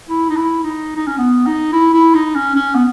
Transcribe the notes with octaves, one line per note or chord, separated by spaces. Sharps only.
E4
D#4
E4
D#4
D#4
C#4
B3
D#4
E4
E4
D#4
C#4
C#4
B3